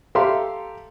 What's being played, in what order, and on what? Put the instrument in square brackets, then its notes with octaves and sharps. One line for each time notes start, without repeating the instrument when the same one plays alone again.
[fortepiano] G4 A4 E5 F5 A#5 C6